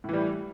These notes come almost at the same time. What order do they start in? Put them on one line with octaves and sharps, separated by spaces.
A2 E3 G3